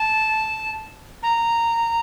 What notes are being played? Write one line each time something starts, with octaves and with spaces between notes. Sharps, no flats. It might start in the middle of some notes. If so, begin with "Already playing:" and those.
Already playing: A5
A#5